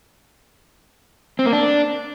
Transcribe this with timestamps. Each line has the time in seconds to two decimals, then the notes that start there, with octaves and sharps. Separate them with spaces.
1.39 C4
1.46 A#3
1.53 D4